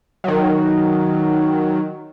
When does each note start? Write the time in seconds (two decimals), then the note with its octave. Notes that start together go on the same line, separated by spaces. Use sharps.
0.24 D#3 F#3